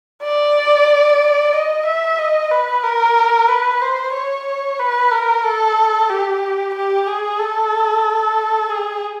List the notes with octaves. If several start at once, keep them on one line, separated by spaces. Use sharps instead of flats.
D5
D#5
E5
D#5
B4
A#4
B4
C5
C#5
B4
A#4
A4
G4
G4
G#4
A4
G#4